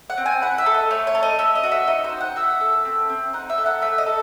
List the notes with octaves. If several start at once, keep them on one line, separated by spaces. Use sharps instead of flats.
F#5
C4
G#5
E4 F#5
E5
A4
D#5
A3 C#5
C#5
A4
D#5
C#4 E5
D#5
F#4
E5
D#4 D#5
C5
D#4
F#5
F#4 E5
A4
C4
C4
D#4 F#5
E5
A4
F#5
A3 E5
D#5
A4